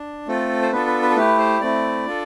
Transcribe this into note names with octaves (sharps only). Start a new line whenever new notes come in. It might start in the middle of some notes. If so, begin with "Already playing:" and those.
Already playing: D4
A3 C4 F4 A4
C5
B3 D4 F4 A4 B4
B4
B4
A4
A3 E4 G4 B4
C5
A3 C4 E4 D5
D4 F4 A4